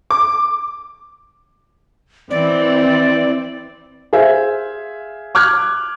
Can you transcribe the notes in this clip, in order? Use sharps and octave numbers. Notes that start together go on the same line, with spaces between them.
D6
E3 C4 D5
G#4 C5 E5 F5
D6 F6 F#6 G#6